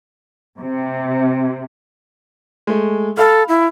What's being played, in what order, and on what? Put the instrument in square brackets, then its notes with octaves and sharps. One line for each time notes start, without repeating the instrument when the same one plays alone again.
[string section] C3
[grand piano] G#3 A3
[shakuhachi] A4 [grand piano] F5 B5 F6
[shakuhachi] E4